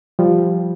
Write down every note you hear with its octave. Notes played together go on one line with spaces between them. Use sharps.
F3 G3